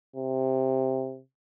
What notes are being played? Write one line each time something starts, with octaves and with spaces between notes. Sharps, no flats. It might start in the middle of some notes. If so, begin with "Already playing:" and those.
C3